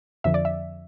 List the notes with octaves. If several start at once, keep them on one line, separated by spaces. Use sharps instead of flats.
F2 D3 F3 E5
D5
E5